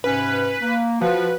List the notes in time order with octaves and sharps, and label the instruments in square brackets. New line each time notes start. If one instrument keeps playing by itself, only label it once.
[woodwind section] G#2 C3 C#4 [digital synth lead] B4
[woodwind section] A#3
[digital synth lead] F3 [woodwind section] F#4 B4